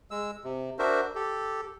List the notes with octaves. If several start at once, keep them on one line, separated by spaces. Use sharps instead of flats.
G#3 E6
C3
D4 F#4 A#4 C5 E5
G4 A4